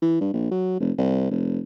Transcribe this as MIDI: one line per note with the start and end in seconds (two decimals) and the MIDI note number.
0.02 0.20 52
0.20 0.33 43
0.33 0.50 34
0.51 0.76 54
0.80 0.92 29
0.98 1.27 36
1.31 1.60 29